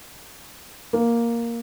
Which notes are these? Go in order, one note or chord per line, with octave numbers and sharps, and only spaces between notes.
A#3